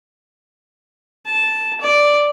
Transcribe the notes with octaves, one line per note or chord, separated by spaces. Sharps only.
A5
D5